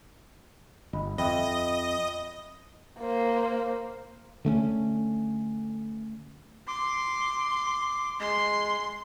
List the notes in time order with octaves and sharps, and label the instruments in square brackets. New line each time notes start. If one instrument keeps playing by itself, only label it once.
[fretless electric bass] G1 [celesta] D#5 B5
[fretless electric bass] F2 [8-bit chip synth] D#5 [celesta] E5 G5 B5
[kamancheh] A#3 C5
[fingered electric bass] D3 A3 B3 C#4
[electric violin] C6 [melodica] D6
[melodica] G#3 [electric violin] C6